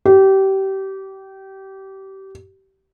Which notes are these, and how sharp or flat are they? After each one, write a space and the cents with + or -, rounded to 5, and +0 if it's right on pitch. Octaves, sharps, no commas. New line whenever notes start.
G4 -25